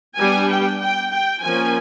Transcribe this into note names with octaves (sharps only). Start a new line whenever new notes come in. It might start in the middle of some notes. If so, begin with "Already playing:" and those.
G3 B3 D4 G#5
G5
G5
G5
F3 A#3 C#4 G#5